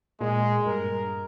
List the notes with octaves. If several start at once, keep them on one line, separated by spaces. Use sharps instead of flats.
A#2 G#3
G2 A#4